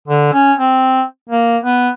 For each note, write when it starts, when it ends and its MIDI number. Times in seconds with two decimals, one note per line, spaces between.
0.08 0.32 50
0.33 0.53 61
0.58 1.03 60
1.29 1.58 58
1.64 1.90 59